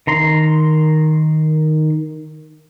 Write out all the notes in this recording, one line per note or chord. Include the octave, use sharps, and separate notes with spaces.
D#3 A#5 C6